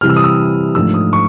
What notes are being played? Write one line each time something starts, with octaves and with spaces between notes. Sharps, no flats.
C3 E3 G3 F6
E6
D#6
E6
G#2 F3 A3 D4 E6
D#6
C#6